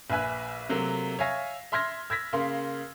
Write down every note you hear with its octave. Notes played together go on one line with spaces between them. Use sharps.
A#1 B4 E5 G#5 F#6
C3 F#3 A3 A#3
C#5 E5 F5 G#5 A#6
E5 C6 F6 G#6 A#6
E6 G#6 A#6 B6
C#3 A#3 F5 C6